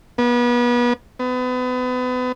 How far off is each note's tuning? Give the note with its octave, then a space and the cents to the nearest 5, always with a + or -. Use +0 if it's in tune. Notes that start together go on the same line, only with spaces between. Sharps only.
B3 -30
B3 +35